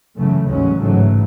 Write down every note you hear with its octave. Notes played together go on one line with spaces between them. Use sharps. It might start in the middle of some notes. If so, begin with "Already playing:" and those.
F#2 C#3 E3 A3
A1 D#2 C#3 F#3 G#3 C#4
G#2 C#3 E3 F#3 A3